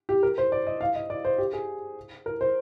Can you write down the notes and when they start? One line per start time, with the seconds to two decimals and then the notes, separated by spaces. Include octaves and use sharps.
0.09 G4
0.23 A#4
0.38 C5
0.52 D5
0.67 D#5
0.81 F5
0.95 D#5
1.10 D5
1.25 C5
1.38 G4
1.53 G#4
2.26 A#4
2.41 C5